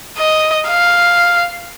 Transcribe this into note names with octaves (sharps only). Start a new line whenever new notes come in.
D#5
F5